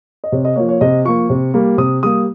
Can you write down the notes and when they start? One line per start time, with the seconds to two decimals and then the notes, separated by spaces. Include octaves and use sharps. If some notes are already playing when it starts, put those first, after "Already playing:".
0.24 D#5
0.32 C3 C#5
0.45 D#5
0.56 F3 A#3 C#5
0.69 C#5
0.81 C3 D#5
1.05 F3 A#3 C#6
1.30 C3
1.54 G3 A#3
1.78 C3 D#6
2.03 G3 A#3 D#6